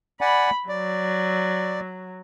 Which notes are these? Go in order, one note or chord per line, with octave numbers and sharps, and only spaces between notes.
D5 F#5 G#5 B5
F#3 D5